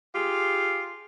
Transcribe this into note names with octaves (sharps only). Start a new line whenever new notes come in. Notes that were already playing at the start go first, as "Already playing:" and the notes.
F4 G4 G#4